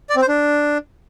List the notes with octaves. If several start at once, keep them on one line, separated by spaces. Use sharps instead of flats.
D5
C4
C5
D4